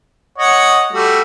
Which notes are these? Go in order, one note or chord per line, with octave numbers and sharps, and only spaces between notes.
C#5 D#5 F#5
G3 A3 F#4